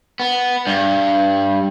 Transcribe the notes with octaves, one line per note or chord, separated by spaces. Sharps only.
B3
G2